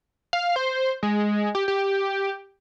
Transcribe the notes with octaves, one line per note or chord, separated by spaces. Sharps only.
F5
C5
G#3
G4
G4